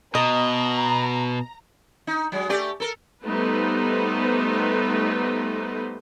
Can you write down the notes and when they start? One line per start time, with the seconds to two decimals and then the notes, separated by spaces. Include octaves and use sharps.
0.15 B2 D#5 A#5
2.07 D#4
2.32 F#3 G#3
2.49 A3 G4 D5
2.80 A4 A#4
3.24 G3 A3 B3 D#4 B4 C5